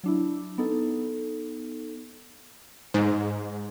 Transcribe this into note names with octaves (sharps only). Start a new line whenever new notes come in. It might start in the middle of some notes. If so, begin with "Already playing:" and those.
F#3 D4 E4
B3 D#4 A4
G#2